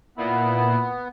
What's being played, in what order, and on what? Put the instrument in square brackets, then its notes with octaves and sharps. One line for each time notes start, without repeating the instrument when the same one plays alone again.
[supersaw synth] A#2 [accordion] B3 [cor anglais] E4